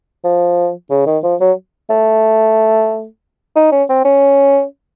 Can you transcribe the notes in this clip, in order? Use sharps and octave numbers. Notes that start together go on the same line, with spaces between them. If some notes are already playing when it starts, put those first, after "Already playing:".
F3
C#3
D#3
F3
F#3
A3
D#4
C#4
C4
C#4